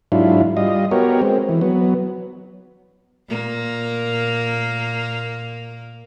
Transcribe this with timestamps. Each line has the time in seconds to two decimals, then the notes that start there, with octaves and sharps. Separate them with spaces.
0.12 G#2 F#3 D4 E4 F4
0.57 G3 F4 D#5
0.91 B3 F#4 G4 A#4 C#5
1.22 G#3 C4
1.49 E3
1.61 F#3 B3
3.29 A#2 A#3